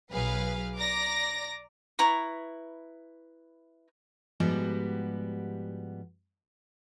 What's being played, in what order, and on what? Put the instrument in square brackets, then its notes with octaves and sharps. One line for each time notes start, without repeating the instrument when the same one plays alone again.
[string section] B1 F#3 G#4 B4 F5
D5 A#5 D6 A#6
[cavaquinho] E4 B4 A#5 C#6
[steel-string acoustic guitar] G#2 F3 G3 B3 F#4 G4